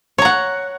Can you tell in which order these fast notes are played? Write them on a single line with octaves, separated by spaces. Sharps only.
C#5 A#5 F#5